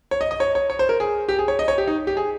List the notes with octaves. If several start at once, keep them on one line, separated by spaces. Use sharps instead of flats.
C#5
D#5
D#5
C#5
C#5
C#5
C5
A#4
G#4
G4
G#4
C#5
D#5
C#5
G4
D#4
G4
G#4